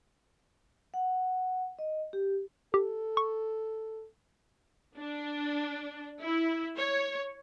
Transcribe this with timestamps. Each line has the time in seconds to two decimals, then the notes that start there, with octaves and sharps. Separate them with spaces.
0.94 F#5
1.79 D#5
2.13 G4
2.74 G4 A4
3.17 C#6
4.97 D4
6.21 E4
6.78 C#5